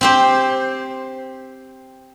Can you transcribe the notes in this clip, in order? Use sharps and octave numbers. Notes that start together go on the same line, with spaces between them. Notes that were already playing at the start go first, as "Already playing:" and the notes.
C4 G4 C5